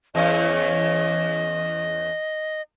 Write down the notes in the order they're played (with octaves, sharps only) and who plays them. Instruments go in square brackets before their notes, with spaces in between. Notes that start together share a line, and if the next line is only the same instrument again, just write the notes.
[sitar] E2 C#4 [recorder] D#5